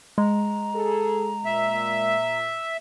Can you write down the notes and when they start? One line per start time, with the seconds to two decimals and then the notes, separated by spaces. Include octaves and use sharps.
0.18 G#3 A#5
0.75 G#4 A4
1.45 A#2 E5